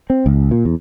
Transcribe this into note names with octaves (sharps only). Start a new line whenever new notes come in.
C4
C#2
A#2
E2